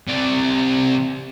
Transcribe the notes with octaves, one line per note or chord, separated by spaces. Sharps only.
C3 D5